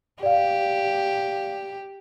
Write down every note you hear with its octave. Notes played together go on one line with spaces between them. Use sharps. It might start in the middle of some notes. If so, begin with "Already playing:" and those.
G4 D5 F5